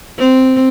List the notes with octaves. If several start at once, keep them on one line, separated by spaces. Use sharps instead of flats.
C4